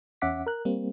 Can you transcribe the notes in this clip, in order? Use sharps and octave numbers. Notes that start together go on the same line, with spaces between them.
E2 C#4 E5 F#5 D6 B6
A#4 F#6
G3 A#3 C4